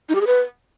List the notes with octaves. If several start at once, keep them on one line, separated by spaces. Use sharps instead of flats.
D#4
G4
G#4
B4